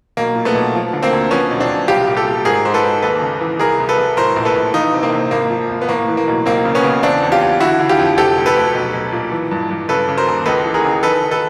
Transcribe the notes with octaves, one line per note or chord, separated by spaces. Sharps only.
B1 A#3
A#2
A3 B3
B1
F3
D3
A#3 C4
D2
F3 B3 C#4
B1
C4 D4
B1
C2 F4 G4
A#2
G4 A4
A#2
G#2 G#4 A#4
G#2 C5
A4 B4
G#2
D#2 A4 B4
C#3
E3
C2 G#4 A#4
C2
A4 B4
C2
A2 A#4 C5
A#1
A4 B4
A#1
E3 D#4 F4
C3
A#3 C4
C3
G#1 A#3
F3
G#1
B3
A2 A#3
E3
A#3
B1
C#2 A#3 C4
C#3
B3 C#4
C#3
E2 C4 D4
E2
F4 G4
E2
D3 E4 F#4
D3
F4 G4
F2
C3 G4 A4
D2
A4 B4
D2
B1
B1
A#2
E3
G2
G2
C#3 A4 B4
C#3
A#4 C5
D#2
C#2 A4 B4
E3
G#4 A#4
C#3
D#3 A4 B4
D#3
A4 B4